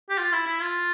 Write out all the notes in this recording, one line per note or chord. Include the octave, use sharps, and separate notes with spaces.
G4
F4
E4
E4
F4